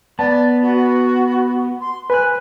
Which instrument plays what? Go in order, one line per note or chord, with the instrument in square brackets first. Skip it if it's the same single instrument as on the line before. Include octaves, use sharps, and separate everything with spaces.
[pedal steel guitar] B3 [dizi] D5 [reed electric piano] A5
[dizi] F#4
C6
[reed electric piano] B4 F#6 [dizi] G#5